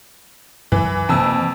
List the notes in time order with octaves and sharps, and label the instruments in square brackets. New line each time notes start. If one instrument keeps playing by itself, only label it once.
[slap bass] F#2 [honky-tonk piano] E3
[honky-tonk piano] F2 E6 [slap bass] C3 E3 A#3